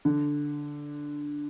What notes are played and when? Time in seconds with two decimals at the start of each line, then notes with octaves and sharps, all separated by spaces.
0.05 D3